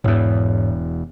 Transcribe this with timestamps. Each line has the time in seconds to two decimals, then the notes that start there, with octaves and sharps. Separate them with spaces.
0.04 E1 E2 G#2 C#5